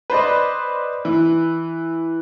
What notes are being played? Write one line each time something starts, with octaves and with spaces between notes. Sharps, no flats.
B4 C5 D5 D#5
E3